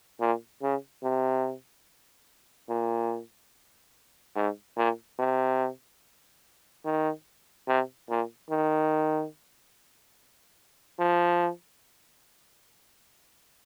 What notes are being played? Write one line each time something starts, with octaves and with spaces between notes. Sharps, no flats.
A#2
C#3
C3
A#2
G#2
A#2
C3
D#3
C3
A#2
D#3
F3